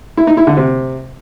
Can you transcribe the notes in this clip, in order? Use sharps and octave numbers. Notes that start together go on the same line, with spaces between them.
E4
D#4
E4
D3
C3